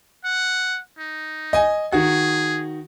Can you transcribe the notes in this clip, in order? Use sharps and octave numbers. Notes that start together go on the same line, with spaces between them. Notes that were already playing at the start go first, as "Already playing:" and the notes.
F#5
D#4
D#5 G#5
D#3 F#4 G#4